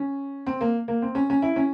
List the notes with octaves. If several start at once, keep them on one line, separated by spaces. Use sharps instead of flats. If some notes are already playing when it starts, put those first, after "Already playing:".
Already playing: C#4
C4
A#3
A#3
C4
C#4
C#4
E4
C#4